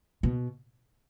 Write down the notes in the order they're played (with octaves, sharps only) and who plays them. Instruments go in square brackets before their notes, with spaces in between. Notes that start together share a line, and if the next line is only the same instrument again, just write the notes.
[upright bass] B2